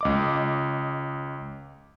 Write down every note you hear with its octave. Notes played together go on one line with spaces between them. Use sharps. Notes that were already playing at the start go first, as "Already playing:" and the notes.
C#2 D#5 D6